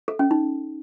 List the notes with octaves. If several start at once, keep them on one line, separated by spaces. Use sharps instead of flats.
A4
C#4
D#4